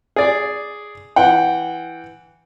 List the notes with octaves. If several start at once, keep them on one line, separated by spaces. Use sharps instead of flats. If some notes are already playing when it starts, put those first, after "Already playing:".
G#4 D5
E3 F#5 G5